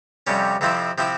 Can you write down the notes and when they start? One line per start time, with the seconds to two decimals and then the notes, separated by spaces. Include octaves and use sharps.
0.27 F2 C3 G3 C#4
0.61 F2 C3 F3 C4 E4
0.98 C3 F3 C4 E4